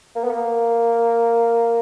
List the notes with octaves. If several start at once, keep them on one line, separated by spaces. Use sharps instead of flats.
A#3
B3
A#3